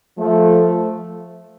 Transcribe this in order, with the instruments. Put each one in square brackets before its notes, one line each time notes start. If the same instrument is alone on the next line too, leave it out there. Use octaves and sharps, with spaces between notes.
[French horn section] F3 A3